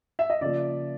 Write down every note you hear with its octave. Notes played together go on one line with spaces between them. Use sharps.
E5
D#5
C#3 F3 A#3 D5